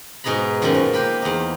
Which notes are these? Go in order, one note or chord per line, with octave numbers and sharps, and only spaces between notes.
G#2 B2 D#4 G#4 A#5 B5
F#2 A#2 D#3 F3
F3
A#3 G4 B4 G5 C6
E2 D#4